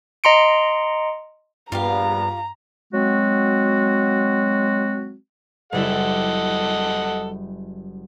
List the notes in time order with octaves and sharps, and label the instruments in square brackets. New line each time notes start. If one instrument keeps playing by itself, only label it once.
[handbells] D#5 A#5 C6 C#7 D7
[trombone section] A#1 G3 B3 [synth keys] G2 [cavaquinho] F4 G4 F5 [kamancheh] A#5
[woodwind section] F#3 G#3 C4 F#4
[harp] F#1 G3 E4 [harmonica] A4 D#5 F#5